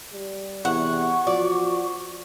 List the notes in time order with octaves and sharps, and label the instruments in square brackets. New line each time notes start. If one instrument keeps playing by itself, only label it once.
[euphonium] G3
[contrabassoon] E2 [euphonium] C3 [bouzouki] F#5 [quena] C#6
[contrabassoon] F3 [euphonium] F#4 [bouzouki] D5